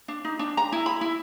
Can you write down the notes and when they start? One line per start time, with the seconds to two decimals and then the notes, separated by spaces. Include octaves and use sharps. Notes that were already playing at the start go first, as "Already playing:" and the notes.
0.08 D4
0.25 D#4
0.39 D4
0.57 A#5
0.72 E4
0.86 B5
1.01 E4